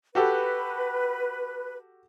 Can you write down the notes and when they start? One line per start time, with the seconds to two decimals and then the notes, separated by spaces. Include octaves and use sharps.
0.15 F#4 G4 A4 B4